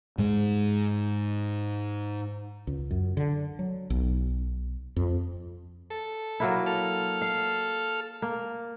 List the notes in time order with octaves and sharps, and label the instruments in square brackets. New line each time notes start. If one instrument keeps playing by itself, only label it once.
[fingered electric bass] G#2 G#3
[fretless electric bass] C#2
F#2
D3
F#3
B1
F2
[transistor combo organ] A4
[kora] F#3 A#3 E4
[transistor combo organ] A4 F6
[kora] F5
A#3